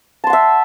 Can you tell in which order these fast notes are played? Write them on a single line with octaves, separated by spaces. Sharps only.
A5 C6 F#5 E5